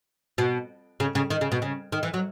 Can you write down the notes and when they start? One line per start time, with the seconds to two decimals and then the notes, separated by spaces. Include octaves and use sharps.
0.38 B2
1.00 C#3
1.15 C#3
1.30 D#3
1.41 C#3
1.52 B2
1.62 C#3
1.92 D#3
2.03 E3
2.14 F#3